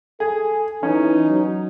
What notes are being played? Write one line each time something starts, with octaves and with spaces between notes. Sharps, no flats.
G#4 A4
E3 C#4 D#4
F#3